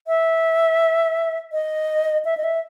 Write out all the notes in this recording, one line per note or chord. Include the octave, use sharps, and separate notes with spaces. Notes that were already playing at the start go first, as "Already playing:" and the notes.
E5
D#5
E5
D#5
E5